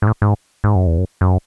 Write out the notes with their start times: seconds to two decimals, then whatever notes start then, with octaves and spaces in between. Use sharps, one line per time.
0.02 G#2
0.07 A2
0.22 G#2
0.64 G#2
0.75 F#2
0.87 E2
0.98 F#2
1.21 F#2